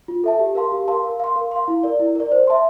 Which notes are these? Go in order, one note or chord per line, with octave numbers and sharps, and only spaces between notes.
F4
A4 E5 A5
G4
A#4 F5 A5 C6
G4
A#4 F5 A5 C6
A#4
F5 C6
A#4
F5 C6
E4
A#4 D5
E4
A#4 D5
C5
E5 A5 C6